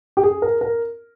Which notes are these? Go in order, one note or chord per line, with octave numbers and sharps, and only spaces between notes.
G4
G#4
A#4
A#4